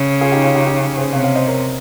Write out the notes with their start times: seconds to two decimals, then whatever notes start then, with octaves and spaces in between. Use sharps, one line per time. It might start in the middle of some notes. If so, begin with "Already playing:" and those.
Already playing: C#3
0.21 F4 G#4
0.32 D#4 G4
0.43 C#4 F4
0.55 D#4 G4
0.66 D#4 G4
0.97 G#4 C5
1.13 C3 C#5 F5
1.24 C#5 F5
1.36 C5 D#5
1.47 A#4 C#5